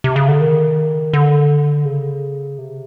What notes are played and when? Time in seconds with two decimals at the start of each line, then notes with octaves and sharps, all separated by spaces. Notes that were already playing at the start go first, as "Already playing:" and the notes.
0.04 C3
0.16 C#3
0.28 D3
0.41 D#3
1.13 D3
1.85 C#3
2.58 C3